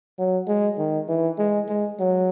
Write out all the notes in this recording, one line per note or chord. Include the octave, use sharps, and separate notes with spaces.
F#3
G#3
D#3
E3
G#3
G#3
F#3